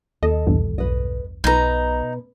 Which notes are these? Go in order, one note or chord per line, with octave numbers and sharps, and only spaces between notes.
D#2 A4 D#5
A#1 E2 G2
B1 B4 D#5
B1 B2 D#4 B4 A#5